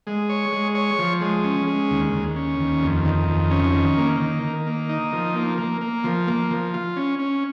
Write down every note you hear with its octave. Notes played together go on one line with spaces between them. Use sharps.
G#3
C#5
G#3
C#5
F3
G#3
C#4
G#3
D#2
D#2
C#4
D#2
F2
D#3
F2
C#4
D#3
A#3
D#3
D#3
A#3
D#4
F3
A#3
A#3
A#3
F3
A#3
F3
F4
C#4
C#4